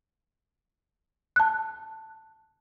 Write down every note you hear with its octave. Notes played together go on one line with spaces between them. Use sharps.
A5 F#6